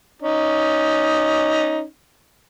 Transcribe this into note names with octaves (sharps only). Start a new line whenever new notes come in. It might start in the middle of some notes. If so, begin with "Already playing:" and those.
C#4 D#4